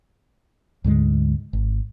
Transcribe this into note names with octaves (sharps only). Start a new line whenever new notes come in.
D2 G#2 D3 G#3
G#1